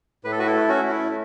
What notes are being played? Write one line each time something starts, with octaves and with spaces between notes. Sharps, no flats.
A2 B4
A4
F#4 B4
E4 A4
A3
C#4 F#4
A3
E4